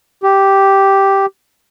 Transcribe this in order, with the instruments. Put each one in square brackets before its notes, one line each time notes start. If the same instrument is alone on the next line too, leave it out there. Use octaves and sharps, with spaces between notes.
[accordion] G4